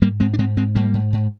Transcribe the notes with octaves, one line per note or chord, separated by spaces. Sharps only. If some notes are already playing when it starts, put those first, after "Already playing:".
G#2 G3 A#3
G#2 G#3 C4
D4
G#2 G#3 C4
G#2 G#3 C4
G#2 G3 A#3
G#2
G#2